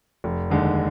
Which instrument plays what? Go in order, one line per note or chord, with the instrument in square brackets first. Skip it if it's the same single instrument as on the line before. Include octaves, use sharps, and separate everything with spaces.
[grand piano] F1
D#2 D3 G#3 D#4